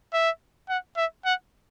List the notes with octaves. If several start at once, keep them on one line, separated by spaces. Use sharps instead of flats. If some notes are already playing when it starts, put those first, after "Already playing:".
E5
F#5
E5
F#5